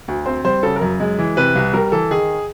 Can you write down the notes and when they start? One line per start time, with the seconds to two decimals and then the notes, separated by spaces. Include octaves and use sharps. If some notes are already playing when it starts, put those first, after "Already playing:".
0.08 D2
0.26 C4 C5
0.45 G3 C5
0.63 C#3 A4
0.76 A#4
0.81 F#2
1.00 G#3
1.19 E3
1.37 C3 B4
1.56 C2
1.73 G3 A#4
1.92 E3 A4
2.11 D#3 G#4